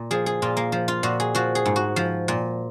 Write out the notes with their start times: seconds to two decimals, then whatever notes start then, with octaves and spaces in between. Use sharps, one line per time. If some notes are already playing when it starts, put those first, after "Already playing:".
Already playing: A#2
0.11 F3 G#4
0.26 G#4
0.42 A#2 F4
0.57 A#3
0.72 F3
0.88 F4
1.03 A#2 F#4
1.20 G#4
1.35 F3 F#4
1.55 G#4
1.66 G#2
1.76 F#4
1.96 F3
2.28 A#2